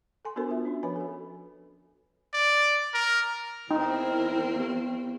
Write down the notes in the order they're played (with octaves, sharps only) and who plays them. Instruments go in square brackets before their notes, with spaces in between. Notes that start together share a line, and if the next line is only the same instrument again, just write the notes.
[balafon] A4 G#5 C6
B3 D4 F#4 A4 A#4 C5
F4 E5
C#4 D4
F3 B4 C#5 G#5 B5
F#4 A4
[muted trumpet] D5
A#4
[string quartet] E2 C4 [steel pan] D#4 [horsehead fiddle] E4 A#4 [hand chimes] G5
[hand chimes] B3 G4